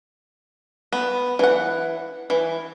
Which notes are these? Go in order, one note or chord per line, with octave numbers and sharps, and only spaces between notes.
B3
E3 F#5
E3